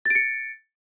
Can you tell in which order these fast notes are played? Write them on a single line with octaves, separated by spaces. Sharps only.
A6 D7 C#7